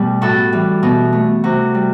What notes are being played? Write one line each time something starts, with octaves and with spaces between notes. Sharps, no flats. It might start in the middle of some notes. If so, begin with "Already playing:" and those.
Already playing: B2 G3 A3 G4
A2 F#4 A4
E3 G3
B2
A3
C3 F#4
G3